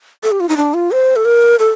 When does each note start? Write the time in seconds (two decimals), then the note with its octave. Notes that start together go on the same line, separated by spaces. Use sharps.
0.23 A4
0.32 G4
0.40 F4
0.49 D#4
0.57 D4
0.74 F4
0.92 C5
1.16 A4
1.25 A#4
1.59 A4